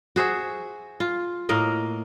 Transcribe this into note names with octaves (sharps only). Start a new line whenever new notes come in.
F#4 G#4 C5 E5
F4
A2 A#3 A#4 D#5